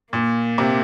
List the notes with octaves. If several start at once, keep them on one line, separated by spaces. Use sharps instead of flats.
A#2 A#3
C3